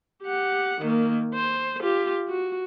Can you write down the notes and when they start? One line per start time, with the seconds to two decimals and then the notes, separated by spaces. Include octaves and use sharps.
0.23 G4 F#5
0.81 D#3 A#3
1.34 C5
1.81 F4 G4
2.28 F#4